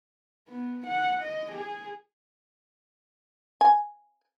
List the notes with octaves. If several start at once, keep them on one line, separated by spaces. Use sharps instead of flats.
B3
F#5
D#5
G#4
G#5